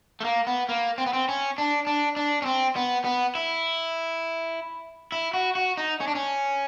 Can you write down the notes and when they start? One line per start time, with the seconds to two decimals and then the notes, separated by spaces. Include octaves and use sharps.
0.20 A3
0.25 A#3
0.47 B3
0.69 A#3
0.98 C4
1.06 B3
1.13 C4
1.29 C#4
1.58 D4
1.87 D4
2.16 D4
2.42 C#4
2.46 C4
2.76 B3
3.04 B3
3.35 E4
5.12 E4
5.34 F#4
5.55 F#4
5.77 D#4
6.01 C#4
6.08 D4
6.15 C#4